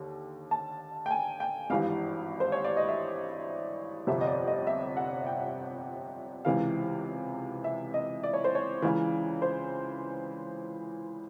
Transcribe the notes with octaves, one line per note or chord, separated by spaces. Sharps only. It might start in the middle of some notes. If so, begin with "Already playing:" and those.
Already playing: D#2 D3
A5
G5
G#5
G5
G#1 G2 E3 F5
C5
C#5
D5
D#5
E5
G1 F2 C3 E5
D#5
D5
D#5
E5
F#5
G5
C#2 C3 E3 F5
E5
D#5
D5
C#5
C5
C#5
C#2 C#3 E3
C5